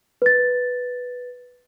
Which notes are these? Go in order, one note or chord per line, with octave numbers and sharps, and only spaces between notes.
B4 A6